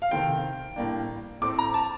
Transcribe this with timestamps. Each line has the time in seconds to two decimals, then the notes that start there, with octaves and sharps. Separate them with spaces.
0.02 F5
0.11 C3 D#3 A3 C4 G5
0.76 A2 G3 A#3 D4
1.41 A2 A3 C4 D6
1.58 A#5
1.74 A5